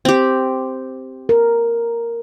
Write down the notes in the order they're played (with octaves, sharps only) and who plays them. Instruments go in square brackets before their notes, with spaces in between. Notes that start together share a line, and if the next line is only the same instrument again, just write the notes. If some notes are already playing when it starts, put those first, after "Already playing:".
[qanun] C4 G4
[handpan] A#4